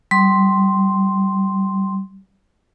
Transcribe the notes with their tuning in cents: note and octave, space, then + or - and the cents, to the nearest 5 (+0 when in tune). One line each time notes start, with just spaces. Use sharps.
G3 -25 C6 +0